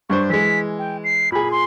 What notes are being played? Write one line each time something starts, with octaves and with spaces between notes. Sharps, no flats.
G2 D4 C5 C#6
E3 G#3 B6
G5
C7
A#2 G#4 B5
C6